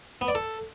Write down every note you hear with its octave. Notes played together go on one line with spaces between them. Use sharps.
B3
D5
A4